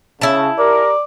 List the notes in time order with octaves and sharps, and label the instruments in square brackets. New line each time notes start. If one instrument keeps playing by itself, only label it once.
[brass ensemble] C#3 [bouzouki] E4 A5
[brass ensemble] G4 A#4 [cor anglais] D5